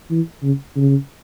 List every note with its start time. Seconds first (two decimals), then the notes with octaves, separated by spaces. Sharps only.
0.10 E3
0.43 C#3
0.76 C#3